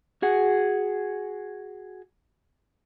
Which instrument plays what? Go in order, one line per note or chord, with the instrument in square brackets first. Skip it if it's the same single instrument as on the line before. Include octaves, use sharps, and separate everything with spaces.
[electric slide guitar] F#4 G#4 F#5